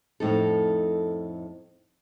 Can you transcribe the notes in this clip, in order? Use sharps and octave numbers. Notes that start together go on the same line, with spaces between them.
F2 A2 D#4 A4